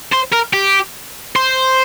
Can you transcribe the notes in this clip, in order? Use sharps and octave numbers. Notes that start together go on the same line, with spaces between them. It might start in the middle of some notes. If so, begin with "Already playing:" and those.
C5
A#4
G4
C5